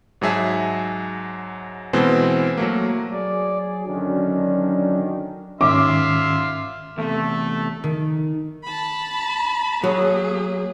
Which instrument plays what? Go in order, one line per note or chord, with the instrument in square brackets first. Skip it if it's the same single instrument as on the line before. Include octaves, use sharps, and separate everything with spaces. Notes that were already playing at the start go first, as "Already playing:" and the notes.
[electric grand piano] G#2 F#3 G#4 E5 A5
B2 E3 G#3 C4
F#3 A3 A#3
[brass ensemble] F#3 G#4 [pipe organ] D5
[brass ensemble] F#2 D3 D#3 [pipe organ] F#3 C#4 D4
[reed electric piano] G#2 D#3 C#4 [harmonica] E5 F5 C6 [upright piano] D6
[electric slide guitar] E2 C3 [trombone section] A3
[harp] D#3
[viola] A5 B5
[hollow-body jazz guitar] F#3 [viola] A#3 G#4